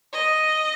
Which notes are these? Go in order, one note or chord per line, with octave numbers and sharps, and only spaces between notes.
D#5